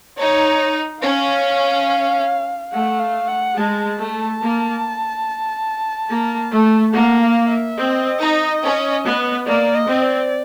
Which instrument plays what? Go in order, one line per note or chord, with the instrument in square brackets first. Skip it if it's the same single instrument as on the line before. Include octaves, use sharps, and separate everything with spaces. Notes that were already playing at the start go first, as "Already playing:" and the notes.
[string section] D#4 [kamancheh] C#5
[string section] C#4 [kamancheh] F5
[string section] A3 [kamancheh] F#5
[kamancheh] F5
F#5
[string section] G#3 [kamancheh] A5
[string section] A3
A#3
A#3
A3
[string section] A#3 [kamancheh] F#5
[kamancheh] F5
E5
[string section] C4 [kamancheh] D#5
[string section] D#4
C#4
B3
[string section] A#3 [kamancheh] D5
[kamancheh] D#5
[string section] C4
[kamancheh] D5